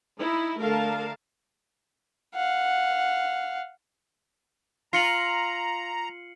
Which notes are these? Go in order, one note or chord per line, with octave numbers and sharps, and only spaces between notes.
D#4 E4
D3 A3 A#4 F5 A5
F5 F#5
F4 A#5 C7 C#7 F#7